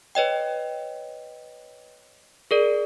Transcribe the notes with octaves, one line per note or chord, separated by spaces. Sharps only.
B4 C#5 D#5 G5
G#4 A#4 D5